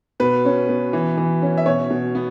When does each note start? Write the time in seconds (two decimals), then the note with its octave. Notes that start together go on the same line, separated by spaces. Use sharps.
0.20 B2 B4
0.45 C#4
0.69 B2
0.93 E3
1.17 E3
1.42 C#4
1.57 E5
1.66 B2 C#5
1.90 B2
2.15 B3